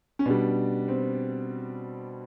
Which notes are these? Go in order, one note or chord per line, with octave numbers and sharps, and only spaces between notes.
C#4
B2 G3 D4
C4